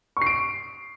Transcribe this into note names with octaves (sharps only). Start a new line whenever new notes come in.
C#6 C7 D7